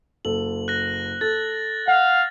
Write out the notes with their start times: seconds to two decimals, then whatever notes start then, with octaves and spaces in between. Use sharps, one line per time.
0.25 F#1 A4 F#7
0.68 F#6 A#6
1.21 A4 A6
1.88 F5 F#5